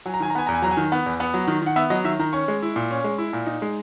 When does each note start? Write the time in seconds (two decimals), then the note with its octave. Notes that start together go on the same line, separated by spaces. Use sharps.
0.06 F#3 G#5
0.14 A#5
0.20 D#3 G#5
0.30 A#5
0.35 B3 G#5
0.47 E2 A#5
0.55 G#5
0.62 F#3 A#5
0.71 G#5
0.77 D#3
0.92 B3
1.06 E2
1.20 B3 F#5
1.34 F#3
1.48 D#3
1.62 D#3 F#5
1.76 B3 E5
1.90 F#3 D#5
2.04 D#3 E5
2.19 D#3 A#5
2.33 C#4 C#6
2.48 G#3
2.62 E4
2.76 A#2
2.91 C#4
3.04 G#3
3.18 E4
3.33 A#2
3.47 D#4
3.62 G#3